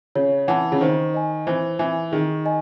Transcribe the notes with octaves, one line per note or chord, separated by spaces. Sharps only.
C#3 C#5
E3 F#5 A5
C#3
D#3 C5
D#5 G#5
E3 C5
E3 E5 G#5
D#3 G#4
D#5 G#5